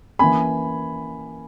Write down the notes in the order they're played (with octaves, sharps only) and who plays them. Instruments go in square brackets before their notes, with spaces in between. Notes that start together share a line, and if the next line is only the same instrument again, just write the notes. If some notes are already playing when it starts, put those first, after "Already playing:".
[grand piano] E3 A#3 C#4 G#5 B5